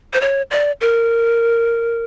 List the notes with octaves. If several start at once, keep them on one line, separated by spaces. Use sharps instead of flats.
C5
C#5
D5
A#4